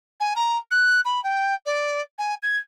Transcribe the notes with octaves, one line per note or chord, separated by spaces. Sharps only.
G#5
A#5
F#6
B5
G5
D5
G#5
G#6